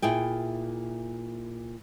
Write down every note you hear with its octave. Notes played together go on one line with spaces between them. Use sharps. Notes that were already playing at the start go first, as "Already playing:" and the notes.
A#2 E4 G#4 G5